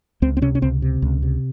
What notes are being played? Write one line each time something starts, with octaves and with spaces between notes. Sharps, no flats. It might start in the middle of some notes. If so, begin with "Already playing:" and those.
C#2 C4
C4
C3 C#4
C#4
C#2 C4
C3
C#2
C3